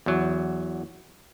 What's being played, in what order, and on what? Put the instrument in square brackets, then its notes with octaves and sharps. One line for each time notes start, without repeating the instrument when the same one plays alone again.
[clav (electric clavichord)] E2 F#3